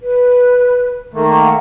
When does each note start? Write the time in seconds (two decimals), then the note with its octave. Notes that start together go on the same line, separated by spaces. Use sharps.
0.01 B4
1.14 D#3 A3 A#3
1.43 F#5